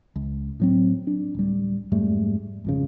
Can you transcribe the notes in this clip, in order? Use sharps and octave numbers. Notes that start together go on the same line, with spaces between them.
C#2
A2 F#3 C4
D4
D1 G3
F2 G#2 G3 A3
G#1 F2 C#3